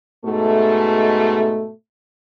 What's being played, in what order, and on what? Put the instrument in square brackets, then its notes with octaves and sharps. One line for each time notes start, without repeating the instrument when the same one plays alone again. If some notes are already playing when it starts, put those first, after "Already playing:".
[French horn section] G#2 B2 A3